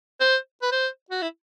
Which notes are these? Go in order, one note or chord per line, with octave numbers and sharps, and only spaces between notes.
C5
B4
C5
F#4
E4